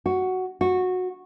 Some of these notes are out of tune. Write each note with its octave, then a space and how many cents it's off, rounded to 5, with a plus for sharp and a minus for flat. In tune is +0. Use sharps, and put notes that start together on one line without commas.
F#4 +5
F#4 -15